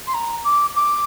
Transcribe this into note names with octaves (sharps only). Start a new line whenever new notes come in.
C6
A#5
D6
D6